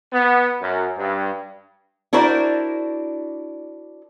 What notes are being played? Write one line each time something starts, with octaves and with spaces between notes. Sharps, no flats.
B3
F#2
G2
D4 E4 F#4 A#4 C5 D5